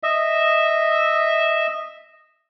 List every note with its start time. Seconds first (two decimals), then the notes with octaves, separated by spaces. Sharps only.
0.03 D#5 E5